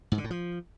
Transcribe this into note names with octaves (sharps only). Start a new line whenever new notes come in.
G#2
D3
A2
F3